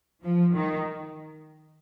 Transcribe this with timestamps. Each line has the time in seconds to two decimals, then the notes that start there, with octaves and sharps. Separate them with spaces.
0.24 F3
0.54 D#3